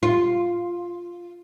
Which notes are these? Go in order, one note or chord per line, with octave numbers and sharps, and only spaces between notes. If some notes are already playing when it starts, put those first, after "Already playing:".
F4